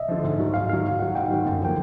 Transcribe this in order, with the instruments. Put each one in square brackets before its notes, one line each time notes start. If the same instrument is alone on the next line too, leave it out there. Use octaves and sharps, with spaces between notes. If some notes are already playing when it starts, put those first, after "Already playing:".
Already playing: [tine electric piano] D#5 E5
[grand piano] D3 F3
G#2
D#3 F#3
[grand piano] G#2 [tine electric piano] F5
[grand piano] D#3 F#3 [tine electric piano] F5
[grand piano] G#2
[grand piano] D#3 F#3 [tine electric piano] F#5
[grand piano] G#2 [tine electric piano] G5
[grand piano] D#3 F#3
F#2
[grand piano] D3 F3 A#3 [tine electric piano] G5